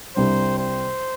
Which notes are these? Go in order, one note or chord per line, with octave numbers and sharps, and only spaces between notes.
C2 C3 G3 D4 C5
C5